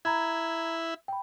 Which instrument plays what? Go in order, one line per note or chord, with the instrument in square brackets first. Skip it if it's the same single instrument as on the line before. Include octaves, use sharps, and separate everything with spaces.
[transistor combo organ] E4 [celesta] A#5 B5 G#6
[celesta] G5 B5